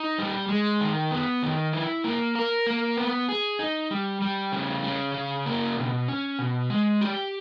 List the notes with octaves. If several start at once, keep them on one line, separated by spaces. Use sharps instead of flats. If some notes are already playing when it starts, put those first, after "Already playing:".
Already playing: D#4
G3
G#3
D#3
B3
D#3
E4
A#3
A#4
A#3
B3
G#4
D#4
G3
G3
C#3
C#4
C#3
A#3
B2
C#4
B2
G#3
G4